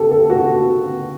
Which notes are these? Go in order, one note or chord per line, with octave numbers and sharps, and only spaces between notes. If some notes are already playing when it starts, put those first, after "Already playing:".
Already playing: G4 A4
A4
F#4